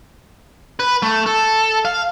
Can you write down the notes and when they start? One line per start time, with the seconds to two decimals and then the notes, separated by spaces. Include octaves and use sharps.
0.80 B4
1.02 A3
1.26 A4
1.85 F5